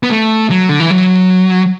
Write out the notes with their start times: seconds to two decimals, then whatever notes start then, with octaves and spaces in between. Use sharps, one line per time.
0.03 B3
0.10 A3
0.50 F#3
0.69 D3
0.80 E3
0.91 F#3